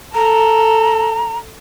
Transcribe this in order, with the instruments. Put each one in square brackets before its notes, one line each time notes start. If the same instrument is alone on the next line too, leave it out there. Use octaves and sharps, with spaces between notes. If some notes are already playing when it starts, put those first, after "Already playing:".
[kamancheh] A4 [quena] A#5